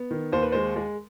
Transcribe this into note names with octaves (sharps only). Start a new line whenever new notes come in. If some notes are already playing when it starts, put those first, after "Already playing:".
Already playing: B3
D#3
D#2 C5
B4
G#3 C5
G#3